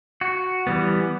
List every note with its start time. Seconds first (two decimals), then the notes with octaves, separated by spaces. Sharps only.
0.21 F#4
0.67 E3 G3 B3